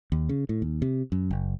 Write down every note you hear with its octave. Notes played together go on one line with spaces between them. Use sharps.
D#2
C#3
A2
D#2
C3
F#2
F#1